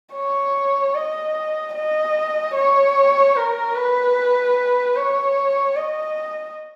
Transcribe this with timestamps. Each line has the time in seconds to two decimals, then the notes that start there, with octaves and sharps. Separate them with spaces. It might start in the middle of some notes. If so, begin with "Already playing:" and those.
0.15 C#5
0.95 D#5
1.75 D#5
2.55 C#5
3.36 A#4
3.76 B4
4.96 C#5
5.76 D#5